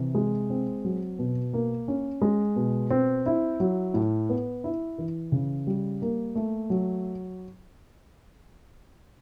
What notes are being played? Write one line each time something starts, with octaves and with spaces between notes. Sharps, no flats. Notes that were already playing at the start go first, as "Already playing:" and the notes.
Already playing: C3 E3
G#3
C4
F#3
B2
A#3
C#4
G#3
B2
C4
E4
F#3
A2
B3
E4
E3
C#3
G3
A#3
A3
F#3